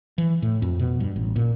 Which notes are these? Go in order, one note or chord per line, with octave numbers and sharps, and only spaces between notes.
E3
A2
F2
B2
G2
A1
A#2